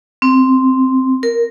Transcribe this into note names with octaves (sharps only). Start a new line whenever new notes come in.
C4
A#4